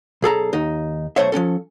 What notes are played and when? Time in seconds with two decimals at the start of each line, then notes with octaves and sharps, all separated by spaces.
0.22 B1 G#4 A4 A#5
0.53 D#2 D#4
1.16 B1 D#3 A3 C5 C#5 E5
1.32 F3 F#3 C#4 A4